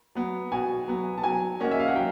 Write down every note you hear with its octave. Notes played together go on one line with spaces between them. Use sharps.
F#3 B3
B2 G#5
F#3 B3
A5
F#3 G#5
A#3 C#4 F#4 D#5
E5
F5
F#5
F#3 G5